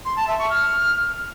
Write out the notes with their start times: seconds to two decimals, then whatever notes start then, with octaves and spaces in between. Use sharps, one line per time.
0.05 C6
0.16 A5
0.27 E5
0.39 C#6
0.50 F6